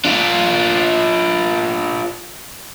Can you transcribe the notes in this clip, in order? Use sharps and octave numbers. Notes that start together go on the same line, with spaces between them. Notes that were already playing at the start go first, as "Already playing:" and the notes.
D4 F4